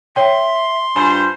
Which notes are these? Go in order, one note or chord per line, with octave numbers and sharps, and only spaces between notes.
C#5 E5 G5 C6
G2 F4 C5 G#5